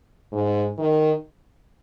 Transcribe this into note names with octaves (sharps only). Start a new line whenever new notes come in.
G#2
D#3